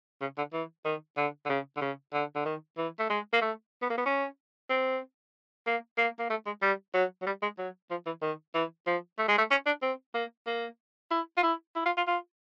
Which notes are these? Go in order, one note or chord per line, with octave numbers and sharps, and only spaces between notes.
C#3
D3
E3
D#3
D3
D3
C#3
D3
C#3
D3
D3
D#3
E3
A3
G#3
A#3
A3
B3
A#3
B3
C#4
C4
A#3
A#3
A#3
A3
G#3
G3
F#3
F#3
G3
G#3
F#3
F3
E3
D#3
E3
F3
A3
G#3
A3
C#4
D4
C4
A#3
A#3
E4
F4
E4
E4
F4
F4
F4